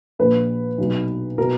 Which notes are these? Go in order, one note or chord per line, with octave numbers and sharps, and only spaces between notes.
A#1 A#2 B4
B1 B2
B2 A#4